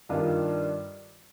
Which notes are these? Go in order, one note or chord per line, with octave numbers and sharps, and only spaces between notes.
G2 D#3 G3 D4 F4